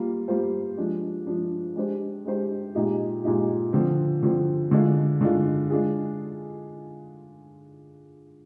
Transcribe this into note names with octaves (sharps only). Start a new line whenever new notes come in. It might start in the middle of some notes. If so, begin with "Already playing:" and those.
Already playing: G3 A#3 F4
G3 A#3 F4 C5
F3 G#3 D4
F3 G#3 D4
G#3 D4 G4 C5
G#3 D4 G4 C5
A#2 G#3 D#4 G4
A#2 G#3 D#4 G4
D3 F3 C4
D3 F3 C4
D3 G#3 D4 F4
D3 G#3 D4 F4
G#3 D4 F4 G#4